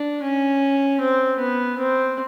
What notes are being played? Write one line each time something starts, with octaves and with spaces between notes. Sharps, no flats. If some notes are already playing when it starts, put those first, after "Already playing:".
Already playing: D4
C#4
C4
B3
C4